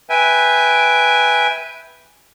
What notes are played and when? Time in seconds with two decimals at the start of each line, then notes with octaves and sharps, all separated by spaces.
0.10 B4 E5 G5 G#5